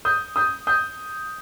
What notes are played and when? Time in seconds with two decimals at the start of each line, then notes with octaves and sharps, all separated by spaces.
0.05 D#6 G6
0.36 D#6 G6
0.67 D#6 G6